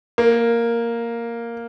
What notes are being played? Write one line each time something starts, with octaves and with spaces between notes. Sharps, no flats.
A#3